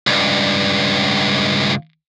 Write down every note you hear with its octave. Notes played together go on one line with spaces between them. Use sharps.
C#2 G2